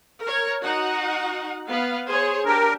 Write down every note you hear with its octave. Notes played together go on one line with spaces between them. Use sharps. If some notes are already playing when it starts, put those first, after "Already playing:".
A#4 C#5
D#4 F#4 F#5
B3 F5
G#4 C5 C#5
D4 G4 A#4